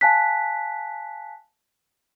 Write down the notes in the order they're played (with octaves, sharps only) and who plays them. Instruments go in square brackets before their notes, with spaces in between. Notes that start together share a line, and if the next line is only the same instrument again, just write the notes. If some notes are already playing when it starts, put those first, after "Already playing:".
[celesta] F5 G#5 A5 F#6 B6